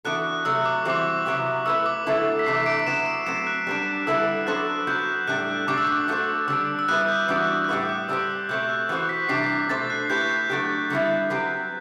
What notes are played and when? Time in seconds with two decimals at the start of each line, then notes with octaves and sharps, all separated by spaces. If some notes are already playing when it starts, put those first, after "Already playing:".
0.05 E3 B3 D4 F#4 A4 F#6
0.45 C3 F#3 A3 E6
0.66 D6
0.85 E3 G3 C4 F#4 C5 D6
1.26 C3 F#3 B3 E4 G4
1.66 A3 E4 B4 E6
1.86 D6
2.06 D3 F#3 A3 E4 A4
2.39 B6
2.46 C3 E3 A3 D4 C7
2.66 D7
2.80 D7
2.87 F#3 B3 E4 E7
3.06 D7
3.26 F#3 A3 C4 E7
3.47 F#6
3.67 G3 B3 D4
4.07 D3 G3 B3 E4 A4 E6
4.47 F#3 B3 D4 A4 C5 F#6
4.87 F#3 B3 F#4 G6
5.27 A2 G3 D4 A4 F#6
5.68 B2 F#3 A3 D4 G4 D6
5.78 E6
5.87 D6
6.08 A3 D4 F#4 A4 C5
6.48 D3 G3 D4 E6
6.79 E6
6.88 G3 B3 E4 G4 B4 F#6
7.08 G6
7.28 E3 G3 B3 D4 F#4
7.65 F#6
7.68 A2 G3 B3 E4 B4 E6
7.89 D6
8.09 G3 D4 G4 C5 E6
8.49 B2 A3 C4 G6
8.69 F#6
8.89 E3 B3 F#4 C5
9.09 B6
9.29 C3 E3 G3 D4 G4 C7
9.69 B2 A3 D4 A4 C5 A6
9.90 F#6
10.10 A3 E4 G4 B4 G6
10.50 F#3 A3 D4 G4
10.90 D3 G3 B3 E4
11.30 F#3 C4 G4 B4